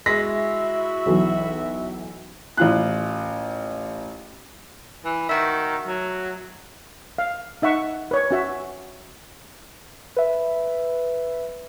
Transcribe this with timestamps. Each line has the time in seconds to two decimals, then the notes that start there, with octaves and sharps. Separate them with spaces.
0.06 G#3 E4 F#4 E5 A#6 B6
1.06 B1 E3 F#3
2.57 A1 F4 F#6
5.05 E3
5.29 D#3 A3 F#4 E5
5.88 F#3
7.18 F5
7.62 D#4 E5 F#5 C#6
8.11 B4 C#5
8.31 C#4 F#4 E5
10.17 B4 E5